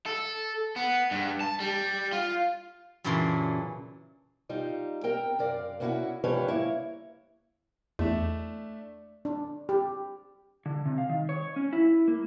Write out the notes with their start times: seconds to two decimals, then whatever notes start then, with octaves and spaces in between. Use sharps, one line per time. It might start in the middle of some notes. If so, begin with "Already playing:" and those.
0.06 A4
0.76 B3
1.11 G2
1.41 A5
1.60 G3
2.12 F4
3.04 F#2 A#2 C#3 E3 D4 C6
4.49 G3 D#4 F4
5.04 C4 A#4 G5
5.39 F#2 A#4 D5 F5
5.80 A#3 B3 C#4 E4 F#4
6.24 G#2 F3 G3 B4 C#5 G#5
6.48 A#3 E4 C#5
7.99 E2 A3 D4 E5
9.25 D4
9.69 G4
10.66 D3
10.86 C3
10.98 F5
11.10 D#3
11.29 C#5
11.56 C#4
11.73 E4
12.08 A#3